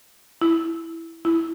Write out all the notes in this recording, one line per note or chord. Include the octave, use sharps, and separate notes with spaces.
E4
E4